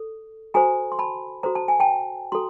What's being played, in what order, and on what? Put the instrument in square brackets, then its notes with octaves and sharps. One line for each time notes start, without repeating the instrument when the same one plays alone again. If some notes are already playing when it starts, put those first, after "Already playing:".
Already playing: [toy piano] A4
F#4 A4 C5 G#5 A#5
C6
A5 B5
F#4 A4 C5 A#5
A5
G#5
G5 A5
F#4 A4 A#5 C6